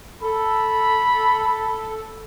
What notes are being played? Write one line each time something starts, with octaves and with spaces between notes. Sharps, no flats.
A4 B5